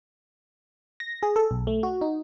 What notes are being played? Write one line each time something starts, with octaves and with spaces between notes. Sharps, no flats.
A#6
G#4
A4
B1
A3
F#4
D#4